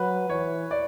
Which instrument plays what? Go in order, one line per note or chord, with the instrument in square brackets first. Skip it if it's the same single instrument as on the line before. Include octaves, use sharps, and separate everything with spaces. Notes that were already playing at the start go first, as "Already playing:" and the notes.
Already playing: [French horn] F#3 [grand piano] B4
[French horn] E3 [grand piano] C#5
[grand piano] D5